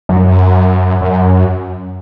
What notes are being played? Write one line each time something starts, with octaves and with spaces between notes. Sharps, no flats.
F#2
F#2